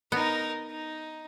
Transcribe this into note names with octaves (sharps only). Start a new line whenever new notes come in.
B3 D#4 A#4
D#4